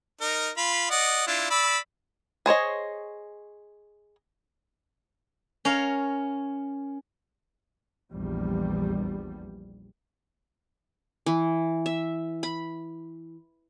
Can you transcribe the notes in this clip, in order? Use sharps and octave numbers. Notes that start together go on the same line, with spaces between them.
D#4 A#4
F4 B5
D5 D#5 F#5
D4 E4 F4
D5 B5 E6
G#4 C5 C#5 D#5
C#4 A#4 C#5 F5
A#1 E2 G3
E3
E5
B5